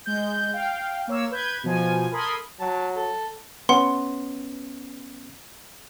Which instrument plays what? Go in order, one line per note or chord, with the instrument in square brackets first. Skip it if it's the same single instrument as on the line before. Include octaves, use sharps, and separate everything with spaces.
[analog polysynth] G#3 G6
F5 G5
A#3 C#5 E6
B4 G6 G#6
B2 F3 G#5
A4 A#4 B5 C6 D#6 G#6
[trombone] F#3 [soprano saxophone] A5
[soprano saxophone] A4
[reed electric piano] B3 C#4 [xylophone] F#5 C6